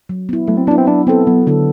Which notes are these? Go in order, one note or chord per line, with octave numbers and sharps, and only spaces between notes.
F#3
B3 E4
F#3 A3
C4
B3 D4 E4
C4
F#3 D4
B3 C4 E4 A4
F#3 B3
D3 B3 E4 A4